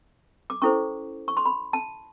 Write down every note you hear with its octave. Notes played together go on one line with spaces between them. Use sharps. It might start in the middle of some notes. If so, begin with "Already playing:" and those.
D6
C#4 E4 A4 C5 C#6
C#6
C6
B5
A5